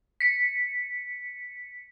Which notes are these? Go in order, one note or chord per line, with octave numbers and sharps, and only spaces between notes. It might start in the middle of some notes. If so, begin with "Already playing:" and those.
B6 C#7